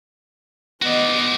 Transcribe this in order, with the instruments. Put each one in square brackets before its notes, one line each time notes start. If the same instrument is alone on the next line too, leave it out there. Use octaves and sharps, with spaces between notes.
[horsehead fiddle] B3 D#5 [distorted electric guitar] F#4 D5